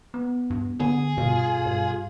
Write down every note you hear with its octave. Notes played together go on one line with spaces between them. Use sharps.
B3
G2
D3 B3 G#4
G2 B2 F4
G2